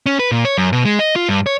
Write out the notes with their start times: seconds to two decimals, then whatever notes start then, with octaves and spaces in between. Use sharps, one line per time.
0.06 C#4
0.19 B4
0.32 A#2
0.45 C#5
0.58 F#2
0.73 B2
0.85 G#3
0.99 D#5
1.16 F4
1.29 G2
1.46 C#5